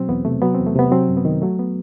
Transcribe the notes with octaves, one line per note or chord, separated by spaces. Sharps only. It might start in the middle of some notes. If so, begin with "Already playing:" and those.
Already playing: B2 F#3 C4
E2 B3
C3 A3
F#3 B3
E2 C4
A3
C3 B3
F#3 C4
F#2
B3
D#3
F#3 A3
B3